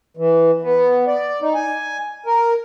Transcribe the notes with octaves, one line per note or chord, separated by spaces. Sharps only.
E3
B3
D5
D#4
G#5
A#4